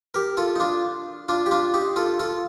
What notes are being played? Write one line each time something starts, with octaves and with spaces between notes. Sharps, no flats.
G4 A#4
F4 A4
D#4
D4 F4
D4 F4
G4
D4 F4
D#4 G4
F4 A4
F4 A4